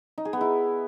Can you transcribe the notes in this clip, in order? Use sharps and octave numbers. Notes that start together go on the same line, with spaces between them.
D#4
G#4
B3
E4